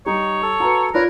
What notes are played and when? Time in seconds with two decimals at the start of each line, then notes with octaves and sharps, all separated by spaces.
0.06 G3 D#4 C#5
0.43 A4
0.60 F#4 B4 A#5
0.94 F4 A#4 B4 C#5 D5